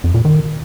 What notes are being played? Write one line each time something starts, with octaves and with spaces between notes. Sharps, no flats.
F2
A#2
D#3